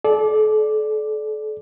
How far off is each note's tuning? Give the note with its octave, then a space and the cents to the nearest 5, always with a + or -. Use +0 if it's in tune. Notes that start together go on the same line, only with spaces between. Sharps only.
A4 -40 D5 +0